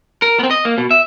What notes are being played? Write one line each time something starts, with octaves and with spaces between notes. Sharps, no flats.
A#4
B3 C4
D#5
A#3
B2
E5